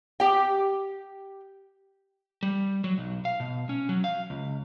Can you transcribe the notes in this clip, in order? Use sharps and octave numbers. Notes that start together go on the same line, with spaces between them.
G4 G5
G3
F#3
B1
F5
B2
C#4
F#3
F5
C#2